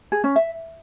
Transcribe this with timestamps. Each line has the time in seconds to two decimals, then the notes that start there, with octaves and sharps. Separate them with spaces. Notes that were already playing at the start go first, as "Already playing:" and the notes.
0.12 G#4
0.24 C#4
0.36 E5